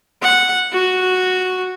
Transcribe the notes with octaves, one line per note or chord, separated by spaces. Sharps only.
F#5
F#4